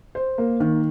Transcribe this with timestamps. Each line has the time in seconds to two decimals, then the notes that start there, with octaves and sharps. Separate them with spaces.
0.15 C5
0.38 A#3
0.60 D#3